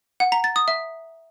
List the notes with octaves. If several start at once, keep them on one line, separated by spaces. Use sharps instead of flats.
F#5
A#5
A6
D#6
E5